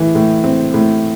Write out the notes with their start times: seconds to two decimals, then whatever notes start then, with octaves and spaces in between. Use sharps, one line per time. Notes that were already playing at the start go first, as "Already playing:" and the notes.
Already playing: A2 E3
0.15 A2
0.44 C4
0.74 A2